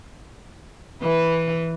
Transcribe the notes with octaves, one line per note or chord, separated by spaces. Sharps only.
E3 B4